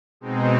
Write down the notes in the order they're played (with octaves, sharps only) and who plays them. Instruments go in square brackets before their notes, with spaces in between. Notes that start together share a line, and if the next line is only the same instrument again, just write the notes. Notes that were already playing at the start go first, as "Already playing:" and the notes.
[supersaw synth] B2 G#3 C4 D#4